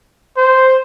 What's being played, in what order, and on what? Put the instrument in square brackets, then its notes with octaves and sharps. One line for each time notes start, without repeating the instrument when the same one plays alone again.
[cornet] C5